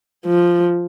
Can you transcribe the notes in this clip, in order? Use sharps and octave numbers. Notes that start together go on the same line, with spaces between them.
F3